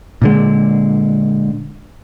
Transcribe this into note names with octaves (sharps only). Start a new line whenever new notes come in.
A#2 D3 G#3